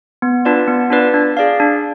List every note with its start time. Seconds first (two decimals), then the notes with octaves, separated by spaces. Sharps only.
0.22 B3
0.45 D4 F4 B4 D5
0.68 B3
0.90 D4 F4 B4 D5
1.14 D4
1.37 G#4 D5 F5
1.60 D4